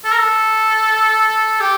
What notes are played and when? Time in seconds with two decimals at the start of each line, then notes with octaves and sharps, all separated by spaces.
0.05 A4
0.12 A#4
0.18 A4
1.61 G4